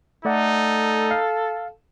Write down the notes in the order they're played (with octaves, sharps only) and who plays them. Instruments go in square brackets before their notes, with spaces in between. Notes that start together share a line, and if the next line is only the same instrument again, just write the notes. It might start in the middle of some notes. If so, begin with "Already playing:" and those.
[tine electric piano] A3 D5 F#5 [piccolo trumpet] D#4 [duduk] A4
[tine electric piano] F5